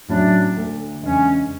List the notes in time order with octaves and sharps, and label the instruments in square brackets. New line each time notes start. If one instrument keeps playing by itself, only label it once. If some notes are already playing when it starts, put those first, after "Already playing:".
[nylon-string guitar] A2 F#3 C#4 E4 [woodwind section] D4
[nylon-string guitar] D2 D3 A3
[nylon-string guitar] E2 C#3 G#3 D4 [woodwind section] C#4